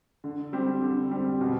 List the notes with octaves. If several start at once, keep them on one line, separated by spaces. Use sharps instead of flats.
D3
G3 C4 G4
D3
G3 C4 G4
B2